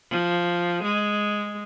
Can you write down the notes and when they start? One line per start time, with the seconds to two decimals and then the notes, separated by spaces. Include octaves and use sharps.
0.10 F3
0.83 G#3